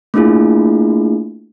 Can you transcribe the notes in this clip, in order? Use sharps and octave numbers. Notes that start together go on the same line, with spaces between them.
A3 A#3 D4 E4 F4 G#4